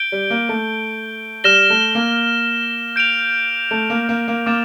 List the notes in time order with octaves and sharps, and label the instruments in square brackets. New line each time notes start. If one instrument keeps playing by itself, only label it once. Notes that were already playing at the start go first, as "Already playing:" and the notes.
Already playing: [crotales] G6 D7 G7
[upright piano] G3
A#3
A3
[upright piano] G3 [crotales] F6 A#6 E7 G7
[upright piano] A3
A#3
[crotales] G6 D7 F7
[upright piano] A3
A#3
A#3
A#3
[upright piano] A#3 [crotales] D6 F6 A6 E7